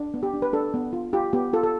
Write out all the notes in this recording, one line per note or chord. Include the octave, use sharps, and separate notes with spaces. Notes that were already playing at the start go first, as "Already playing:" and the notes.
Already playing: D4
B3
G4
D4
B4
D4 A4
B3
F4
F4 G4
B3 G4
F4 A4
A4